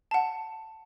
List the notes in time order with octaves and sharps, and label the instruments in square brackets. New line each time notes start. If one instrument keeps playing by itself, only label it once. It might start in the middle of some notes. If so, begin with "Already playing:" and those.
[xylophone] F#5 A5